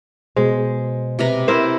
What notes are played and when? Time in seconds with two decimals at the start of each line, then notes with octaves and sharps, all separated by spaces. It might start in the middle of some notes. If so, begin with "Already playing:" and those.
0.37 B2 G#3 C5
1.19 C3 B4 A#5
1.48 E4 A#4 C5